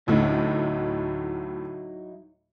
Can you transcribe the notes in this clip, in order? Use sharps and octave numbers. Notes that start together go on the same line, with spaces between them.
D2 A2 F#3 D#4 E4